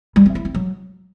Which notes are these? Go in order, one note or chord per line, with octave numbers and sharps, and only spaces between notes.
G3
C4
E4
C4
F#3